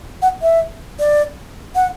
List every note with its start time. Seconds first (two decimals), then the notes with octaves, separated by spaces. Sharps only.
0.22 F#5
0.42 E5
0.99 D5
1.75 F#5